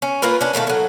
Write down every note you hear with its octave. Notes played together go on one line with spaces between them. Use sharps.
C#4
A#3 F4 A#4 B4
C#4 D4
B2 D#3 A3 F5
A2 F#3